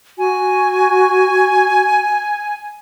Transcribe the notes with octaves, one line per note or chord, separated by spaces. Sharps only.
F#4 G#5